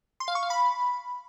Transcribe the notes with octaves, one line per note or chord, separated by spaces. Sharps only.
C6
F5
C#6
F5
B5